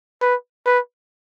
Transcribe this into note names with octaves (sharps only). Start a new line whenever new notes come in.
B4
B4